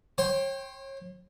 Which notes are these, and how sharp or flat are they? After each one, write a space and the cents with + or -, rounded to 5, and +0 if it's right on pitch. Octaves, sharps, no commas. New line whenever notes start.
C#5 -35 G5 +0 C6 +0